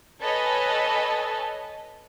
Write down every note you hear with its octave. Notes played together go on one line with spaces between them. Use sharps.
A4 B4 C#5 D#5 G#5 A5